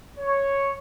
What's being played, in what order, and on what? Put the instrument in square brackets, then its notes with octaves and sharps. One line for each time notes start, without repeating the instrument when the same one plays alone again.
[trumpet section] C#5